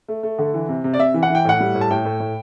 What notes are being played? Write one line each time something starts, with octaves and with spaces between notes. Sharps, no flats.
A3
A3
D3
E3
C3
C3
D5
C3 E5
E3
F#5
E3 G5
A2 F#5
G3
A2
A5
A2 G5
A2
A2